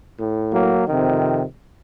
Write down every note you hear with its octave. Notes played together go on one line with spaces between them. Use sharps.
A2
F#3 A#3
F2 C3 D#3